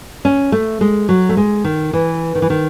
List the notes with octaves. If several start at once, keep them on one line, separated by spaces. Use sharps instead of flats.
C#4
A3
G#3
F#3
A3
G#3
D#3
E3
D#3
E3
D#3